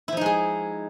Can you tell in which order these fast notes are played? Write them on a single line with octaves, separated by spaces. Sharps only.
E4 F3 D#4 G#3 G#4